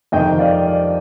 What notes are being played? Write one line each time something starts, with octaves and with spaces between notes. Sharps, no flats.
F2 C3 D#3 D#5 G5
D5 F5
D5 F5